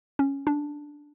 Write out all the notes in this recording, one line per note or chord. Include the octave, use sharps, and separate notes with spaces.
C#4
D4